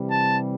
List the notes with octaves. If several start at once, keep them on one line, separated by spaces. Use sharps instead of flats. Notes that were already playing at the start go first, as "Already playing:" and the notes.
Already playing: C3 E3 G3
A5